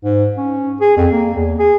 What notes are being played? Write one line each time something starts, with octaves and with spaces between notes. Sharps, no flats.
G#2
C#4
G#4
F2
A#3
E2
G#4